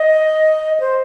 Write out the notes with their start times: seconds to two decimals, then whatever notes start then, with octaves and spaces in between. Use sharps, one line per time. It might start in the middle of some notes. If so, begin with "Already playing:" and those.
Already playing: D#5
0.80 C5